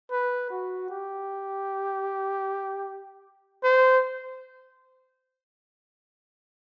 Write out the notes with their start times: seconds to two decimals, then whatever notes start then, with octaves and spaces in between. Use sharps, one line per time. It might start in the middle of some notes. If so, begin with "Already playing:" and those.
0.12 B4
0.51 F#4
0.91 G4
3.64 C5